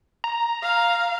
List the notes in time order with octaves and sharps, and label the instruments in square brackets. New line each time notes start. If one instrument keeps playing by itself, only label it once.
[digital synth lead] A#5
[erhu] F5